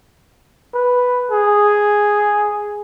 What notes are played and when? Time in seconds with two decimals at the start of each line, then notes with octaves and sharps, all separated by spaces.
0.74 B4
1.31 G#4